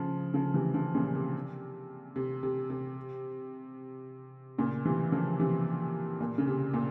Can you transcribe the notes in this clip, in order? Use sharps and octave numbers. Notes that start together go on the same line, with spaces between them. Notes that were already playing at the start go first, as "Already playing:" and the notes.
Already playing: C#3 F3
C#3 F3
C3 E3
C#3 F3
A#2 C#3
C3
C3
C3
C3
A#2 C#3
C3 E3
C#3 F3
C3 E3
A#2
C#3
C3
A#2